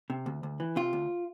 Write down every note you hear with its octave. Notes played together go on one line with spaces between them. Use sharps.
C3
D2
D2
E3
C3 F4
D2